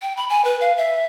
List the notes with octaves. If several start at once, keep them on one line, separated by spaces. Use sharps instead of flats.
G5
B5
G#5
B4
F5
E5